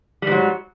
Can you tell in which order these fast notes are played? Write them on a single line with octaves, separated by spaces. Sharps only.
G3 G#2 F#3